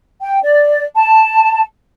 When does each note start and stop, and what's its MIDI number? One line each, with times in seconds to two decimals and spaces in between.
0.21 0.40 79
0.43 0.84 74
0.95 1.61 81